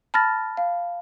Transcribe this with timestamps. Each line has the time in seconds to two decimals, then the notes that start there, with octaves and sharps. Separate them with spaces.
0.14 A5 B5 F6 A6 A#6
0.57 F5